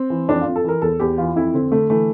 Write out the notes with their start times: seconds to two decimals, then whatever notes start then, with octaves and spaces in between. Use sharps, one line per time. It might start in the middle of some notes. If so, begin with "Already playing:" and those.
Already playing: C4
0.10 E3
0.28 F2 D4
0.41 F2 F4
0.56 A4
0.64 E3 A#4
0.82 E2 A4
1.00 E2 G4
1.18 E3 F4
1.35 F2 E4
1.54 D3 C4
1.71 D3 A3
1.90 E3 A3